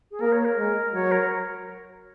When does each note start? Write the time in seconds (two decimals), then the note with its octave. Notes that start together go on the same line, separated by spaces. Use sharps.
0.11 G#4
0.20 A#3 A#4
0.32 C#5
0.45 A#4
0.57 G#3
0.93 F#3 C#5
1.12 A#4